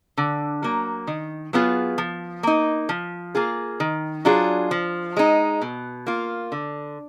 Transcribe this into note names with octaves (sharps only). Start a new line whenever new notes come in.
D3
F#3 A#3
D#3
F#3 B3 F4 G#4
F3
A#3 D#4
F3
A#3 F4 G#4
D#3
F#3 D4 F4 G#4
F3
G#3 D#4
B2
A#3 F4
D3